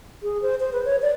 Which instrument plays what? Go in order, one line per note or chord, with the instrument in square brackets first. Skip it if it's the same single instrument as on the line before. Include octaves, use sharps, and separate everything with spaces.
[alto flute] G#4
C5
C5
B4
C#5
D5